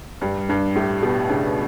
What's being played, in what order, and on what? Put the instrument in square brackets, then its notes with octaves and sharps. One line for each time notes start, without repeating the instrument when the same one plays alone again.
[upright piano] G2 [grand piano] G3
[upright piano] G2 [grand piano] D4
[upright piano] A2 [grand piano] G4
[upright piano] B2 [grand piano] G4
[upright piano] C#3 [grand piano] D4